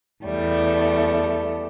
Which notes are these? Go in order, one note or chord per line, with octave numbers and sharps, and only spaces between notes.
E2 G3 A3